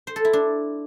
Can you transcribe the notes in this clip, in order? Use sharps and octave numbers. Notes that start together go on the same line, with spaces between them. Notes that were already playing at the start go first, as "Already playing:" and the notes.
C5
A4
E4
D4